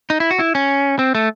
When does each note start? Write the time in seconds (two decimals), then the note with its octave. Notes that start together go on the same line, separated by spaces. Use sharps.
0.10 D#4
0.20 E4
0.31 F#4
0.39 E4
0.55 C#4
0.99 C4
1.15 A3